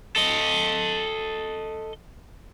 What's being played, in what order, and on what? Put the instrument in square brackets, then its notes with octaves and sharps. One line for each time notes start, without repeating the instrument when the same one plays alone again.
[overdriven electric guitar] A4 D#5